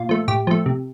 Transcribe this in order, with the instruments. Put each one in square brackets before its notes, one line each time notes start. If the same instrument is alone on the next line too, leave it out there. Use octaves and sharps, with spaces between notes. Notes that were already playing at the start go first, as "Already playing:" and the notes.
Already playing: [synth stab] A#2 F4
F3 A3
A2 G4
F3 A3
C3